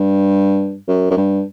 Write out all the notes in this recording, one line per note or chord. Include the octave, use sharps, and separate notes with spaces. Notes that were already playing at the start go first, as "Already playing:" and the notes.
Already playing: G2
F#2
F#2
G2